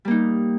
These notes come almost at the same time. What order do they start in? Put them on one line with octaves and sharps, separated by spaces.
G3 A#3 D#4